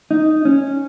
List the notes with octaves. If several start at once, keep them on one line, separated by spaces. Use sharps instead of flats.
D#4
C#4